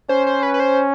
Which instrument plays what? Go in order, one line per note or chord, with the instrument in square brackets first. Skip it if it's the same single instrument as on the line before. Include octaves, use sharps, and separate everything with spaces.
[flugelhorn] C#4 [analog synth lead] C5
[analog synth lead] C5
B4
B4
C5